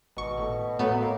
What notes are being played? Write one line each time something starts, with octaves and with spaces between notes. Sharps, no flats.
G#1 B2 C#6
A2
A2 F#3 A3 B3
A#3